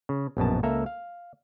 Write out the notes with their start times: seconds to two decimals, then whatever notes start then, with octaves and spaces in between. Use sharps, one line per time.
0.09 C#3
0.37 A#1 F#2 B2 A5
0.63 C#2 A#3 A4 E5 A#5
0.86 F5